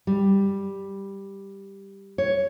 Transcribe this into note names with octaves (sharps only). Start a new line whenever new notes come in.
G3
C#5